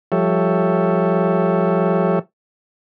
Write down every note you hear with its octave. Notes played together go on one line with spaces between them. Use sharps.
F3 G3 G4 A4 C#5 E5